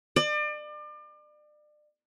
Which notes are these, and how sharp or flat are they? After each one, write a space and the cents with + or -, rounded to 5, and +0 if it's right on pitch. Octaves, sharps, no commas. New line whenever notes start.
D5 +35